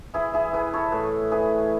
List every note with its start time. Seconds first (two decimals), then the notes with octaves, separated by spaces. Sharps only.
0.14 E3 E4 G#4
0.34 E4 G#4
0.53 E3 G#4 B4
0.73 A4 C#5
0.92 A2 G#4 B4
1.32 E3 G#4 B4